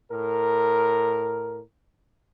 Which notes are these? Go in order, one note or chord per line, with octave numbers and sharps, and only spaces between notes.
A2 A#4